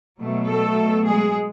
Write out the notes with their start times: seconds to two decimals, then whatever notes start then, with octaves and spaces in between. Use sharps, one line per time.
0.20 B2 F#3 A3
0.49 A3 A4
1.08 G#3 G#4